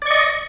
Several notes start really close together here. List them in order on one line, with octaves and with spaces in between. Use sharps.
D5 C#6 D#5